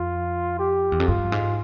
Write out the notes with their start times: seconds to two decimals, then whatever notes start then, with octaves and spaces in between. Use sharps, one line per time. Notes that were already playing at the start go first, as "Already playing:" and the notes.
Already playing: F2 F4
0.59 G4
0.92 E2
1.00 F2
1.07 G2 F4
1.32 G#2